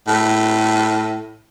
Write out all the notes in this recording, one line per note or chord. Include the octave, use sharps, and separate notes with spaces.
A2